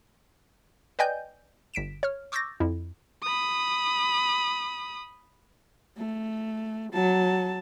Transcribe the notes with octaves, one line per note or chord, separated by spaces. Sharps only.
B4 D5 D#5 G5 G#5 G6
G1 B6 D7 E7
C#5 F6
C#6 D6 E6 G6 A6 A#6
F2 E4
B5 D#6
A3
F#3 A5